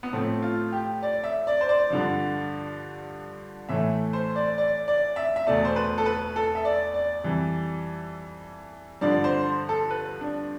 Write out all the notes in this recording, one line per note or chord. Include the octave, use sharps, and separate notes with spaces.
B3
A2 F3 A3 C4
F4
G4
D5
E5
D5
C5
D5
G2 D3 F3
A2 E3 A3 E5
C5
D5
D5
D5
E5
E5
E2 B2 A3 D5
C5
B4
A4
B4
A4
E5
D5
D5
F2 E3 G3
G2 D3 F3 D5
C5
A4
B4
D4